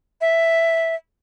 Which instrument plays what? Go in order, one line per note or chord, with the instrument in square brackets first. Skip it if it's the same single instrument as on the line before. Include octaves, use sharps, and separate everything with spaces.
[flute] E5